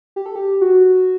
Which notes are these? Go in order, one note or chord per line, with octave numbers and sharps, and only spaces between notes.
G4
A4
G4
F#4